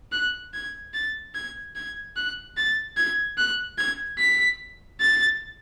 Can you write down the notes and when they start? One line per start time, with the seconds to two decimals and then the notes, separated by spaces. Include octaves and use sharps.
0.12 F#6
0.54 G#6
0.94 A6
1.35 G#6
1.76 G#6
2.16 F#6
2.57 A6
2.97 G#6
3.37 F#6
3.78 G#6
4.18 B6
5.01 A6